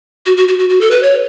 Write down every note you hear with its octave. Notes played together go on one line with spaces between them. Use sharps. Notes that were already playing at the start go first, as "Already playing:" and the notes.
F#4
F#4
F#4
F#4
F#4
A4
B4
C#5